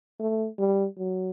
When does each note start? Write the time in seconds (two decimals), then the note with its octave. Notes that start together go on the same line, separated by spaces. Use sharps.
0.20 A3
0.59 G3
0.98 F#3